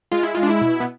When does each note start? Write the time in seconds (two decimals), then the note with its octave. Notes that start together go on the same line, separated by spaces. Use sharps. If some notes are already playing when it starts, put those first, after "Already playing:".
0.12 G#3 F4
0.23 E4
0.35 G#3 F4
0.43 D4
0.49 E4
0.61 B2
0.80 B3